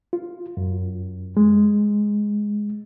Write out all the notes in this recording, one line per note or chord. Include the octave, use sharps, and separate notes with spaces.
F4
F#2
G#3